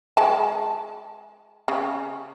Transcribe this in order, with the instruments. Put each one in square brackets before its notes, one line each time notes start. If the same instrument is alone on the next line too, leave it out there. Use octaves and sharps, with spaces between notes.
[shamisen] G#3 A5
C#3